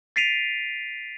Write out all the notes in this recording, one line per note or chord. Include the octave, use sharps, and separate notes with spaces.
A6 B6 C7 D7 D#7 F7